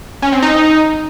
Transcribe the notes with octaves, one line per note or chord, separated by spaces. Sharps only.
C#4
C4
D#4